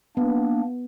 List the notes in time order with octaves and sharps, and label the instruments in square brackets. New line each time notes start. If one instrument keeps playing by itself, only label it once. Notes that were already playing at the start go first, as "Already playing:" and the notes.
[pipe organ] A#3 D4 [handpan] B3